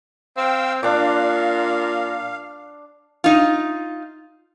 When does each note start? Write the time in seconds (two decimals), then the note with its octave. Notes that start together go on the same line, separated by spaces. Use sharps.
0.37 C4 F5 G5 E6
0.83 A#2 D4 F5 D6
3.24 D#4 F4